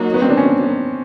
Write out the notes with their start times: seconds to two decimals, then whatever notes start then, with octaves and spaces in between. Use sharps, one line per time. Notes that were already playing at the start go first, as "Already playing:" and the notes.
Already playing: F#3 A#3 D#4 F#4
0.14 B3
0.22 C4
0.30 D4
0.37 C#4